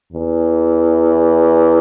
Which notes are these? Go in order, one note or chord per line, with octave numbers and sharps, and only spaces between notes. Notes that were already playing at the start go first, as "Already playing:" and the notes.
E2